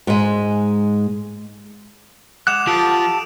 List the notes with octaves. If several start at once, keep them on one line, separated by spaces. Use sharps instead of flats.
G#2 G#3
G#3 F#5 D6 F#6 E7
F3 G4 A4 F#5 A5 D#6 D7